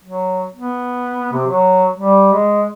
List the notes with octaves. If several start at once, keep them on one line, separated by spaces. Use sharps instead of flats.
F#3
B3
C3
F#3
G3
G#3